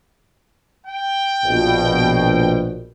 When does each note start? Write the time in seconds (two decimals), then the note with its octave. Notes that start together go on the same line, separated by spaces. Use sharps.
0.87 G5
1.45 A#1 B2